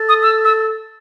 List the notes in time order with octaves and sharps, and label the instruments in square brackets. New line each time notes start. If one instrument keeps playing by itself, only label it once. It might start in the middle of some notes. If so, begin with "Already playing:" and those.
Already playing: [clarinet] A4
[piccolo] D#6
E6
E6